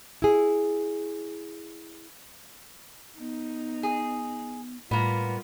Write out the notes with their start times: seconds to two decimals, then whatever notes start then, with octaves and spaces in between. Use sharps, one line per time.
0.22 E4 G#4
3.19 B3 D#4
3.83 G#4
4.91 A2 G3 A#3 B3 F4